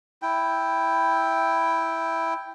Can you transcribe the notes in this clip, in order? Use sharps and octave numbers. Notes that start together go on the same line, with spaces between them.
E4 G5